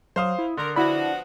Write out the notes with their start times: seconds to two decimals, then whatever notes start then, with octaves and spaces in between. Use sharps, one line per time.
0.16 F#3 C5 F5 D#6
0.39 E4
0.57 D3 A#4 C6
0.76 F3 B3 D4 E4 F#4 B5